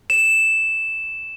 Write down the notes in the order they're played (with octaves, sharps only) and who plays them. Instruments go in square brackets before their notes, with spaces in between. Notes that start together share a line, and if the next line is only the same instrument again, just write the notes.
[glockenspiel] E7